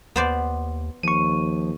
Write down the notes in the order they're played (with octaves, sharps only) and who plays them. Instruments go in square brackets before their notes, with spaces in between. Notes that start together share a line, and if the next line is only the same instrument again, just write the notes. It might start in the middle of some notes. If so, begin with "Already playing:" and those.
[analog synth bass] D#2 [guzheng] B3 C5 D5
[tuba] D#2 [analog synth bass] F3 [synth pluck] C#6 D#7